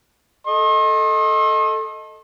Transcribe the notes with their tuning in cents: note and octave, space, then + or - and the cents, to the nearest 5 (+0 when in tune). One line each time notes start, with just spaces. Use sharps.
A4 +0 D#5 +5 C6 +45